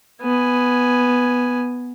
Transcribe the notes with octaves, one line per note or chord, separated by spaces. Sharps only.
B3 G#5